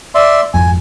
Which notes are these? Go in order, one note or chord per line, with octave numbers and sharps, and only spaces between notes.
D5 E5 C6
G#1 F2 G#5